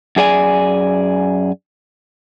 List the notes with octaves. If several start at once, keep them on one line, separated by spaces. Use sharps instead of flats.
F#2 G#4 D5 G#5